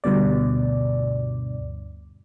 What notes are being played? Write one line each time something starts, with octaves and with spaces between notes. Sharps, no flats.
D2 G2 B2 D5